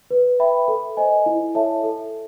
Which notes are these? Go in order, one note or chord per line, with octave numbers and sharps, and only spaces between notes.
B4
E5 G5 B5
A4
C5 D#5 G#5
E4
A4 C#5 E5 A5
A4